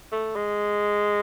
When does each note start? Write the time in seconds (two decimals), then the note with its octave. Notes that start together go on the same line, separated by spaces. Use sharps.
0.12 A3
0.35 G#3